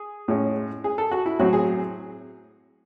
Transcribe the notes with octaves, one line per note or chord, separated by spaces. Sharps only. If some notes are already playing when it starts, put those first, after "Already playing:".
Already playing: G#4
A2 G#3 C#4
G#4
A4
F#4
E4
A2 F#3 C4 F#4
G#4